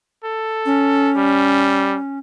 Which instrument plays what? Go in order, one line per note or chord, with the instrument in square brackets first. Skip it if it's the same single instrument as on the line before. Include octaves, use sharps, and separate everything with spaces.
[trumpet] A4
[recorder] C#4
[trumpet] G3